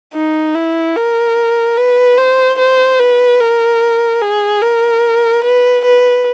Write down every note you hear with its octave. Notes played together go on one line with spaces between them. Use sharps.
D#4
E4
A#4
B4
C5
C5
B4
A#4
G#4
A#4
B4
B4